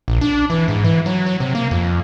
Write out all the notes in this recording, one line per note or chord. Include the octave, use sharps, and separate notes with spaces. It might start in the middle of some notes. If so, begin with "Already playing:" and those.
A#1
D4
E3
G#2
E3
F#3
F#3
C3
A#3
F2